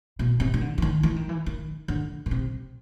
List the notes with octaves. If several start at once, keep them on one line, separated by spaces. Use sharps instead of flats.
B2
C3
D#3
D3
E3
D#3
E3
D#3
E3
D#3
D3
B2
C3